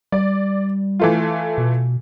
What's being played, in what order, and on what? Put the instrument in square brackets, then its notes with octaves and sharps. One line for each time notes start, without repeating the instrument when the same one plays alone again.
[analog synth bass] G3 [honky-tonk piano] D5
[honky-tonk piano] E3 A3 F4
[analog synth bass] B2